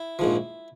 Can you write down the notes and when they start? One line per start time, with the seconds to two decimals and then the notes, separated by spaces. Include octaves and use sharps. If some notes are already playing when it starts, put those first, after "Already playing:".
Already playing: E4
0.19 A#1 G#2 F3